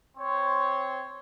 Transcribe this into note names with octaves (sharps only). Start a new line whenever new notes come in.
C4 C5 C#5